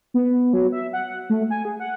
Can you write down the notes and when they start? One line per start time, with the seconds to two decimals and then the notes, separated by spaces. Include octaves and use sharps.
0.14 B3
0.53 F#3
0.72 E5
0.93 F#5
1.30 A3
1.50 G#5
1.65 G#4
1.80 F#5